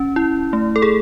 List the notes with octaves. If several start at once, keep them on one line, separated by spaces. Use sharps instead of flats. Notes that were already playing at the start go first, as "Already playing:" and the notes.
Already playing: C#4
E4
A3
A4
G#4